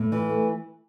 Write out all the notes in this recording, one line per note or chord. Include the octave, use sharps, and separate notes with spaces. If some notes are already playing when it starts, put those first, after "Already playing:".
Already playing: A2
E3
A3